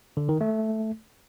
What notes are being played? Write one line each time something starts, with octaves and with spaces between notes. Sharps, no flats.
D3
D#3
A3